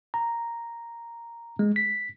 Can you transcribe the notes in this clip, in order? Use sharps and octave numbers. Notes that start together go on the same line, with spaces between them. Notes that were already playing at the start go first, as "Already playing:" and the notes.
A#5
G#3
B6